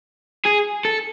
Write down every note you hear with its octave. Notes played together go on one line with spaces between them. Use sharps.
G#4
A4